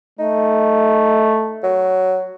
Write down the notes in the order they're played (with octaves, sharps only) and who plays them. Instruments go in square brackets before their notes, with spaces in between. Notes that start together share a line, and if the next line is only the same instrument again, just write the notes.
[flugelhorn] A3 [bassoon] D#4
[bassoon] F#3